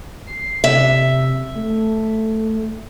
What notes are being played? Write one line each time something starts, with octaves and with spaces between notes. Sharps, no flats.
C7
C3 E5
A3